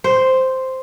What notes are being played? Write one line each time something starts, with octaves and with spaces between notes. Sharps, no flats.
C5